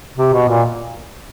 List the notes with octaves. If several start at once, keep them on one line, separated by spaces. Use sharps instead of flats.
C3
B2
A#2